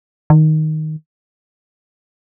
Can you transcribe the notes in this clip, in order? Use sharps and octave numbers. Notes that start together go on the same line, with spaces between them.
D#3